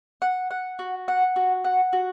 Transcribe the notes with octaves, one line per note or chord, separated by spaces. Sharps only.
F#5
F#5
F#4
F#5
F#4
F#5
F#4